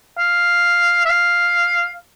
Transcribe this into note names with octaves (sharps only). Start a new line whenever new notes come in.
F5
E5
F5